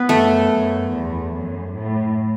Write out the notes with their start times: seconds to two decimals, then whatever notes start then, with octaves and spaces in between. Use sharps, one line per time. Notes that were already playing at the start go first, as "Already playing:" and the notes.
Already playing: B3 B4
0.09 F#2 A3 A4
0.52 F#2
0.93 E2
1.34 F#2
1.75 A2